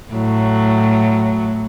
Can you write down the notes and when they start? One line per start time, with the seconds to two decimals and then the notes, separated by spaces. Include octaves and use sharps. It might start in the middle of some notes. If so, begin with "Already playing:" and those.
0.12 A2 F#3